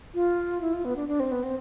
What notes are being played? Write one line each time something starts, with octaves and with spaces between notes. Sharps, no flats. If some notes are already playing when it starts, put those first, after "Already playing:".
F4
E4
F4
B3
D4
D4
C4
B3
C4